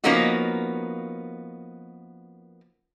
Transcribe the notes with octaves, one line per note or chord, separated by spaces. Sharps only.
F3 A#3 B3 C#4 D#4 F#4